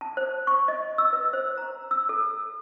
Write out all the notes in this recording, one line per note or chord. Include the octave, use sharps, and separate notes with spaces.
A5
C5
C#6
D#5
E6
B4
C5
A#5
E6
A4